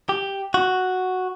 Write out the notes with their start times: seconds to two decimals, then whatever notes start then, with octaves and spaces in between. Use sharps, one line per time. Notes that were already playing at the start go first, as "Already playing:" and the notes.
0.09 G4
0.54 F#4